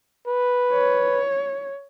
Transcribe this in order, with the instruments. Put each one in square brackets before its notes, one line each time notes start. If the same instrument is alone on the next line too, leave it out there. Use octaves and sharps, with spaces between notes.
[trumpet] B4
[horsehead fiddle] C#5